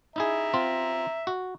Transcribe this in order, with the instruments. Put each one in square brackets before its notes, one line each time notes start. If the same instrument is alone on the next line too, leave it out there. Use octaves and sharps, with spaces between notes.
[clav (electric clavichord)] D#4 E4 G#4 [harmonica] E5 A#5
[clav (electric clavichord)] C4 F4
F#4